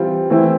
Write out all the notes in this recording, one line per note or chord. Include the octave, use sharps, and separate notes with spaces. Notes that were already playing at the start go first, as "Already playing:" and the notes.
Already playing: E3 G3 C4 F4
E3 A3 C4 E4